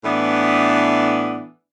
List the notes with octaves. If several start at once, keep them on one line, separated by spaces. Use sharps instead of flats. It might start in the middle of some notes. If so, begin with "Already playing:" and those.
A2 E3 B3 D4